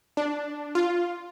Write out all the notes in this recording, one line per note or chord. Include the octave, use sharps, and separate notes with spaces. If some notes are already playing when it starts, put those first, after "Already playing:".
D4
F4